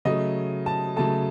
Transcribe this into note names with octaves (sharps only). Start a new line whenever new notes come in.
C#3 F#3 A3 D#5
A5
C#3 F#3 A3 A5